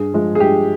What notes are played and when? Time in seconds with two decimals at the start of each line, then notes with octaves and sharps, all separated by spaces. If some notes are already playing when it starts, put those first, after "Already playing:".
Already playing: G2 G#4
0.13 F3 G#3
0.35 G#4
0.39 G2 G4